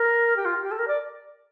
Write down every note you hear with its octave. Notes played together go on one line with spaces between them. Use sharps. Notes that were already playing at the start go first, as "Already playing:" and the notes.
Already playing: A#4
G4
F4
G4
A4
A#4
D5